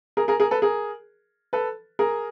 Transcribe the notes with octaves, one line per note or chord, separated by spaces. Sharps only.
G#4 A#4
G#4 A#4
G#4 A#4
A4 B4
G#4 A#4
A4 B4
G#4 A#4